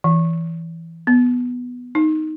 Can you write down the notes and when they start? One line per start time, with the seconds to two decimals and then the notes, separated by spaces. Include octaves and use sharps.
0.04 E3
1.07 B3
1.95 D#4